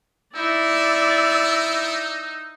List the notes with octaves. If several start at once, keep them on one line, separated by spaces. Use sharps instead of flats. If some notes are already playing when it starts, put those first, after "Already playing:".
D#4 E4 D5 E6